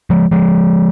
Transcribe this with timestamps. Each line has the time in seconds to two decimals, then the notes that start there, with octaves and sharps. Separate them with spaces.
0.10 F3 G#3
0.31 F3 G#3